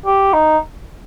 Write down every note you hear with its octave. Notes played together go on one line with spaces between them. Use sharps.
G4
D#4